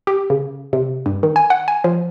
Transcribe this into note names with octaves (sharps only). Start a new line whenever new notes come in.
G4
C#3
C3
G2
D#3
G#5
F#5
G#5
F3